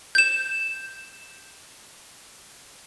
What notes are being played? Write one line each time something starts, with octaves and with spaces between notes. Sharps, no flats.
G6 E7